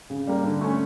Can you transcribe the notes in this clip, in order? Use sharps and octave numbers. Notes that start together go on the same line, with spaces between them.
C#3
G3 A#3
D3
A3 C#4